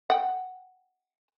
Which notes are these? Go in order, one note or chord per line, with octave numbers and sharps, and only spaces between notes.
F#5 G5